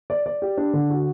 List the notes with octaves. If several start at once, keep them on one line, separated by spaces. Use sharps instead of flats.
D5
D5
G4
D4
D3
F#4